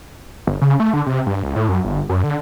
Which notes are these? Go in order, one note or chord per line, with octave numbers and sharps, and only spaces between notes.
G1
C#3
A3
D3
C3
G2
C#2
A2
F#2
G1
F#2
D3